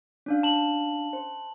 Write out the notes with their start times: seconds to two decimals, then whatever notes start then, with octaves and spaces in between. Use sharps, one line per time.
0.26 C#4 D4 F5
0.43 A5 F#7
1.13 C5